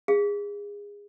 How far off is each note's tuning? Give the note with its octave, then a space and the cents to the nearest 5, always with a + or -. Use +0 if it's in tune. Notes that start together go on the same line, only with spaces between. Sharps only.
G#4 -25 F5 -20